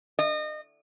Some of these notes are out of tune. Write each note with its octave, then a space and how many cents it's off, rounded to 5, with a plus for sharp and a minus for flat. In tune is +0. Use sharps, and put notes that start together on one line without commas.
D#5 -30